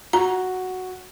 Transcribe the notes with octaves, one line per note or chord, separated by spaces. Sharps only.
F#4 A#5